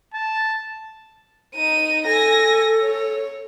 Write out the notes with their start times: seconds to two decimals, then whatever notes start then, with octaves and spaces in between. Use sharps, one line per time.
0.14 A5
1.56 D#4 D#7
2.04 A4 G#5 A#6
2.81 C#5